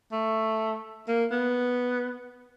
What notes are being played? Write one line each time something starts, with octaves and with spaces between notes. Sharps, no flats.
A3
A#3
B3